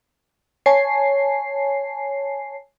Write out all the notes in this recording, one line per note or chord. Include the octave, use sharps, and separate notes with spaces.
C#5 G#5 A5 C7